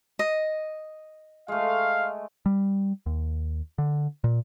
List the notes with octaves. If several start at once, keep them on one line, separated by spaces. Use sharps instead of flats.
D#5
G#3 A3 F5
G3
D#2
D3
A#2